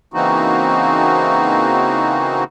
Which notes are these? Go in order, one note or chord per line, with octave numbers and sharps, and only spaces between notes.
C#3 E3 A#3 C4 D#4 F#4